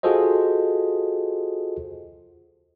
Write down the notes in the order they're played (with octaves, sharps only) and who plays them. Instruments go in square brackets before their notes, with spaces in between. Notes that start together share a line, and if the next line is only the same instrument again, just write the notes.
[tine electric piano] F4 F#4 G#4 A4 C5 D#5